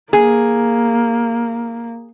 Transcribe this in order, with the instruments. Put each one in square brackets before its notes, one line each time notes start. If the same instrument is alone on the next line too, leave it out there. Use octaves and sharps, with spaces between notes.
[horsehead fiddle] A#3 [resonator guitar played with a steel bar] G#4